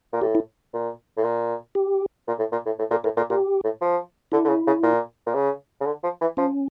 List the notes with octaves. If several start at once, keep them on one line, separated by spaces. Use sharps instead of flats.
A#2
A2 G4
E4
A#2
A2
A#2
G4
A#2
A2
A#2
A2
A2
A#2 A4
A2 A#4
A#2 A4
A#2 G4
A2
F3
D3 E4
D3
C#3
C#3
A#2
A#2
C#3
C#3
D3
F3
E3
F3 C#4